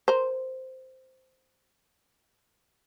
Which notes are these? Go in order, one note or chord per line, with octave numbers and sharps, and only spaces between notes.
A#4 C5